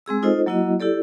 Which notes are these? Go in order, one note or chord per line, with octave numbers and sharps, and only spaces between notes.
G#3 C4 G#4 E6
D#4 F4 A4 C5 D#5
F#3 A#3 E4 F#4 D#5
E4 G4 A4 D5